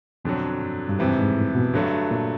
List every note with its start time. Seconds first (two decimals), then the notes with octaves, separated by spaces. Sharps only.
0.25 F2 B2 D3 F#3
0.62 G2
0.90 G2
0.99 F2 G#2 C3 E3
1.18 G#2
1.37 A2
1.55 B2
1.74 G2 D3 F#3 A3
2.11 A#2